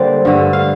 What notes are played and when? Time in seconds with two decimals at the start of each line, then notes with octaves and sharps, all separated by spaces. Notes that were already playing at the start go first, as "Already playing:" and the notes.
Already playing: D3 G3 A#3 C5 D5
0.25 G2 D3 A3
0.53 F5